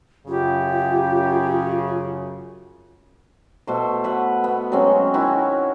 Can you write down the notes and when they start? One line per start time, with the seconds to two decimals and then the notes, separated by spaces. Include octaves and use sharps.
0.28 F#2 C#3 F4 G4
3.67 B2 A3 C5
4.04 B4 E5 F#5
4.44 B3
4.72 F#3 G#3 C4 C#4
5.14 D#3 E4 F#4 C#5